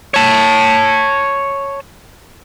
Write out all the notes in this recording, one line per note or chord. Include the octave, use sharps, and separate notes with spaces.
C#5 A5